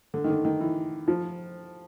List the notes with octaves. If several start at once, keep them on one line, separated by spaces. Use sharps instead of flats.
D3
D#3
D3
D#3
E3
F3